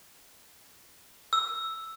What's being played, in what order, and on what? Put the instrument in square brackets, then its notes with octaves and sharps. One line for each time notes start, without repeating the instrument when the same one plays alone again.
[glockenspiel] E6